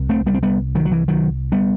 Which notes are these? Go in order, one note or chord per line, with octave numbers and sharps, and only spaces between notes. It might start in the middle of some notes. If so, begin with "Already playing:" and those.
Already playing: C2 C3
A3 C4
G3 B3
C4
G3 B3
D#3 F#3
F#3
E3
D#3 F#3
G3 B3